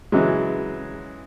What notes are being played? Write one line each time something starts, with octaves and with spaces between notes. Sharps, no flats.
C#3 E3 F#3 G#3